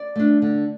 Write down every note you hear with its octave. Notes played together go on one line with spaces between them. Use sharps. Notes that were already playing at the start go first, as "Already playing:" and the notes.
Already playing: D5
A3 D4
D3